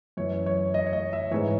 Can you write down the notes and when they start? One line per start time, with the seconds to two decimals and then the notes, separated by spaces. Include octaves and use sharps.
0.17 F#2 E3 C#5
0.46 C#5
0.74 D#5
0.87 C#5
0.93 D#5
1.13 E5
1.31 G#2 E3 C#5